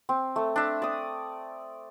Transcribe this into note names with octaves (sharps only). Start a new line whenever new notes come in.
C4
A3
D4 E5
D5 D#6